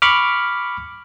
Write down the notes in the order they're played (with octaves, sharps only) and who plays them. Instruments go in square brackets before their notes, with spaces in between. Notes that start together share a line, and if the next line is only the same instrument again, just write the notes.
[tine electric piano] B5 C#6 D6 F6